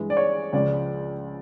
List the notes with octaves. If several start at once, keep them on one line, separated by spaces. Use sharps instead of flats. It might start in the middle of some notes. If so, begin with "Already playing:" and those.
Already playing: G2 E3 G#3
D5
C#5
C#2 C#3 F3 G#3 D5